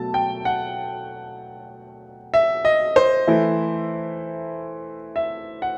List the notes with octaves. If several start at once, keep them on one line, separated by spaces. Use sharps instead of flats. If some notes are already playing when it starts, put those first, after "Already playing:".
Already playing: B2 F#3 A3 A5
G5
F#5
E5
D#5
C5
E3 A3 E4
E5
F#5